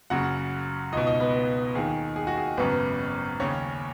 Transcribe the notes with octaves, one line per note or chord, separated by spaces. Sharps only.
F#1 F#2 C#3 F#4 F#5
C#2 B2 D#4 D#5
D#4 D#5
B3 B4
D#2 D#3 G#4
G#4
F#4
G#4
G#1 F#2 C#3 B3 B4
D#2 C#3 C#4 C#5